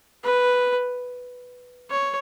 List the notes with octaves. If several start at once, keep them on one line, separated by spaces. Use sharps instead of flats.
B4
C#5